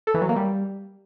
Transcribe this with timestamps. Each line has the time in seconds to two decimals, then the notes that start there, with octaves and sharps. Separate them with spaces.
0.07 A4
0.14 E3
0.22 F#3
0.29 A#3
0.36 G3